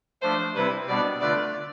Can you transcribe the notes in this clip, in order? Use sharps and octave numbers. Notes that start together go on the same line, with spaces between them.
F3 A3 D4 C5
C3 G3 C4 E4 B4
B2 G3 B3 D4 D5
D3 A3 D4 F4 B4 D5